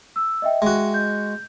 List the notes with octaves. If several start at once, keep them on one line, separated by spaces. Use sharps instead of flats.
E6
D#5 E5 G5
G#3 F#4
G6